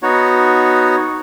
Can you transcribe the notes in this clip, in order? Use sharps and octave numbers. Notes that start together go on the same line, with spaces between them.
B3 D#4 F#4 C#5